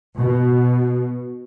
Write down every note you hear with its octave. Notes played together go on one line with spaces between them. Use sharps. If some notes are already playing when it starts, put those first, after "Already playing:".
B2